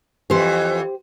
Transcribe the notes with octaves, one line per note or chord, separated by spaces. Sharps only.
F2 E3 G4 C5